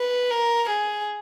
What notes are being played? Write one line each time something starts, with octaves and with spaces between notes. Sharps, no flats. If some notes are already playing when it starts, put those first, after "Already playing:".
Already playing: B4
A#4
G#4